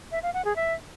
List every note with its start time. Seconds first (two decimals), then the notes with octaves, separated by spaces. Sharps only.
0.12 E5
0.23 F5
0.34 F#5
0.45 G#4
0.56 E5